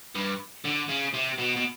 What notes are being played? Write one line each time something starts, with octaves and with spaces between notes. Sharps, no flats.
G2
D3
C#3
C3
B2
B2